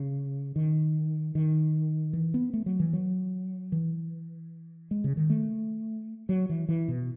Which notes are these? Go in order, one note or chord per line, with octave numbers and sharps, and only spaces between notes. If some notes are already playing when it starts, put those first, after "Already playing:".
Already playing: C#3
D#3
D#3
E3
B3
A3
F#3
E3
F#3
E3
G#3
C#3
D#3
A3
F#3
E3
E3
B2